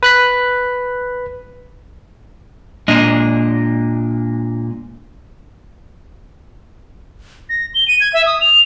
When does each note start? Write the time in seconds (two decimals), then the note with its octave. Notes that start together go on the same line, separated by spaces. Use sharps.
0.03 B4 F#6 B6
2.88 A#2 G#3 D4 D#5
7.49 A#6
7.75 G7
7.88 D#7
8.00 G#6
8.13 E5
8.26 D#6
8.41 F7